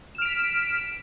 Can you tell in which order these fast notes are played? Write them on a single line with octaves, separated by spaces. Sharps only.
E7 F6 D7 B6